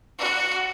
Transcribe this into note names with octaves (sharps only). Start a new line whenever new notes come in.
F#4